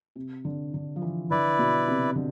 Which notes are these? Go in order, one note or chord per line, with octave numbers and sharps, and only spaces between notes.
C3
D3
D3
F3
E3
D3 E4 B4 D5
B2
C3
D3